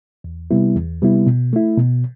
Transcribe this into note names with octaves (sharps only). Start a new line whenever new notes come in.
E2
C3 G3 B3 E4
E2
C3 G3 B3 E4
B2
A3 E4
B2